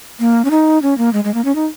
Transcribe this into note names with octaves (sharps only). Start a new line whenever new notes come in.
A#3
C#4
D#4
C#4
A#3
G#3
G#3
A#3
C#4
D#4